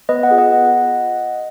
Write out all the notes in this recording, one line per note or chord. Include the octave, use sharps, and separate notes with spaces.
B3 B4 D#5
D#5 F#5
F4 G#4
D#5 F#5
B3